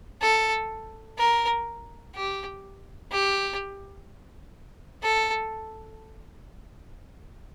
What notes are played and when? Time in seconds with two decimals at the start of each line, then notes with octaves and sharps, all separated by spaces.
0.22 A4
1.18 A#4
2.15 G4
3.12 G4
5.03 A4